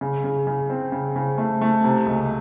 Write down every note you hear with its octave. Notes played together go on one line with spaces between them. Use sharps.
C#3
C#3
C#3
C4
C#3
C#3
A3
A3
C3
C#2